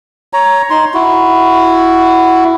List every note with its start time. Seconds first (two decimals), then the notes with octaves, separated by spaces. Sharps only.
0.33 C#5 A#5
0.70 D#4 C6
0.94 E4 F#4